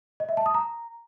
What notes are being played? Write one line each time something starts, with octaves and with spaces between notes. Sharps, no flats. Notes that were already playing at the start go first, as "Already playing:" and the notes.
D#5
E5
A5
D#6
A#5